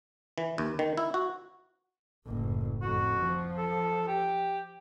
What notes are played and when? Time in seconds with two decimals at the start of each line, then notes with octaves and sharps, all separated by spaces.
0.38 E3
0.58 D#2
0.79 D#3
0.98 E4
1.14 F#4
2.26 F#1 A2
2.82 F2 A2 F#4
3.19 F3
3.58 A4
4.08 G4